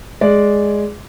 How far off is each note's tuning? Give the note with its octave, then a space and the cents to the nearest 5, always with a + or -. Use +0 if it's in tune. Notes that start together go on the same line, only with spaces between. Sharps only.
G#3 +0 D5 -10